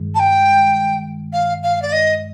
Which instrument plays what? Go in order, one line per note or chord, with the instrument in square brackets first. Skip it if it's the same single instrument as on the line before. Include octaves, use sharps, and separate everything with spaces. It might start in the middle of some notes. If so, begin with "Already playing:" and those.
Already playing: [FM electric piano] G2 D#3 G#3
[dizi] A5
G5
F5
F5
D5
D#5